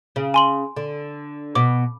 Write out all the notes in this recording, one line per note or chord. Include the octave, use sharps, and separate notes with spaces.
C#3
G#5 C6 F#7
D3
B2 D6